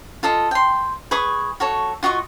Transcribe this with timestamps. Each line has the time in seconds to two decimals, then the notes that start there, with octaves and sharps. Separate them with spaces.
0.23 F4 A4 D#5
0.51 G5 C6
1.11 G#4 B4 C#6 D#6
1.60 F#4 A4 C#5
2.03 F4 F#4 D#5 C#6